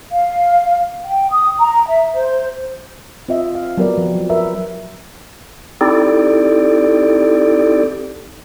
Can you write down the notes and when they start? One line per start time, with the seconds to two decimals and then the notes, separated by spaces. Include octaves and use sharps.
0.12 F5
1.06 G5
1.31 D#6
1.59 A#5
1.89 E5
2.15 C5
3.29 C4 F4 D#5 E5
3.55 F5
3.77 F#3 B3 G4 A#4 B4 D5
3.98 F3
4.15 F#3
4.30 A#4 B4 E5
5.81 C4 D#4 E4 G4 A4 D5